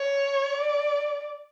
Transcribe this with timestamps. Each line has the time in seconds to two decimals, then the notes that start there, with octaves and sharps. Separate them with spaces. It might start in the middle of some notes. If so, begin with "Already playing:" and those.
Already playing: C#5
0.53 D5